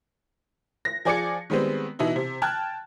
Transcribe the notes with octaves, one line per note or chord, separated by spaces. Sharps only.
A#6
F3 G#4 D5 D6 G#6 C#7
D#3 G3 G#3 B3 C4
B2 E3 D#4 E4
C3
G5 A5 F6 F#6 G#6